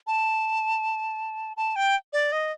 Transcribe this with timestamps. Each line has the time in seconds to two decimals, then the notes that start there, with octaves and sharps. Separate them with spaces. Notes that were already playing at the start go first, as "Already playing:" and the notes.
0.07 A5
1.57 A5
1.76 G5
2.13 D5
2.32 D#5